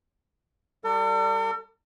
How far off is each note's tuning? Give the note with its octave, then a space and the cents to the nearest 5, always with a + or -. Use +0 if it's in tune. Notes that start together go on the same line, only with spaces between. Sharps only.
G3 +0 A4 +45 D5 -5